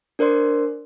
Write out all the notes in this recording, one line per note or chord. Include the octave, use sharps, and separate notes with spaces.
D4 A#4 C5 D5 C6